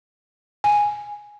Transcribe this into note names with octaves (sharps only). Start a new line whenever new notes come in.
G#5